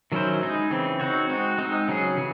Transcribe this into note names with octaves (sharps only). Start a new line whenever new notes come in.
D#3 F#3 C#4 E4 C5
G#3 D#4 G#4
C#3 E3 C4
C4 D#4 F#4 C#5
G#3 C4 D#4 F#4
G#3 C4 D#4
C#3 F#3 C#4 G#4
C#3 E3